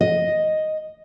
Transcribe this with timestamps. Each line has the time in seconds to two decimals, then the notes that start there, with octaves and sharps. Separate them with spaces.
0.01 D#5